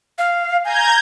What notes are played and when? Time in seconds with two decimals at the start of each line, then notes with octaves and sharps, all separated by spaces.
0.18 F5
0.65 G#5 A#5 G6 G#6